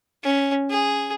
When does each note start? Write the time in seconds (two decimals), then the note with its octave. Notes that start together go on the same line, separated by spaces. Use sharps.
0.24 C#4
0.70 G#4